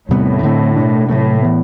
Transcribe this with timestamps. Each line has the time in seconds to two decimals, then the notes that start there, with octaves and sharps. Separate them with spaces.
0.09 E2 A2 C3 G3 B3
0.43 D3 A3 C4
0.76 B2 A3 D4
1.09 A2 C3 F#3 A3
1.42 E3 B3